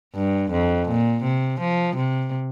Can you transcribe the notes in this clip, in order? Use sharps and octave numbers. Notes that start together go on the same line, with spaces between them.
G2
F2
A#2
C3
F3
C3